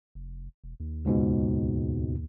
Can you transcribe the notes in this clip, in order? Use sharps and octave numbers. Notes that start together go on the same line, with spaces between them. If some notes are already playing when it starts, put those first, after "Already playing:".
F1
E1
D#2
C#2 G#2 B2